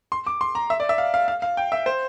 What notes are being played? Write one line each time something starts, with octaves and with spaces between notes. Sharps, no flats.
C6
D6
C6
A#5
E5
D5
E5
F5
F5
F5
F5
G5
E5
C5